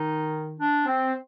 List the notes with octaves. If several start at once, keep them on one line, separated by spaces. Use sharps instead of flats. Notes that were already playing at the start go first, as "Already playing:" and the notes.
Already playing: D#3 D#4
D4
C4